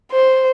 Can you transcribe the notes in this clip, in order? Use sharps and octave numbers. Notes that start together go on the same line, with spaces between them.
C5